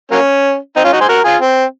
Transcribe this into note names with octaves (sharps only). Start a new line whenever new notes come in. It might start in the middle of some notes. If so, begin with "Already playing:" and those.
F#3 A#3 C#4
C4 D#4
C#4 F4
D#4 F#4
G#4 C5
F#4 A#4
F4 G#4
C4